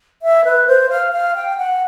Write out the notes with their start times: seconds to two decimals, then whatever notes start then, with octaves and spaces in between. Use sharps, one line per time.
0.22 E5
0.45 B4
0.67 C5
0.90 F5
1.13 F5
1.35 G5
1.57 F#5